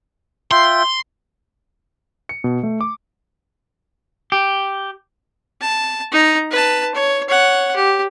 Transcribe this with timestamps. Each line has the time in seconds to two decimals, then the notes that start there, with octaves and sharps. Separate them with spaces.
0.51 F4 E5 G5 C6
2.29 C#7
2.44 B2
2.63 A3
2.81 D6
4.32 G4
5.61 A5
6.12 D#4 A#5
6.51 B4 A5
6.94 C#5
7.29 C#5 F#5
7.75 G4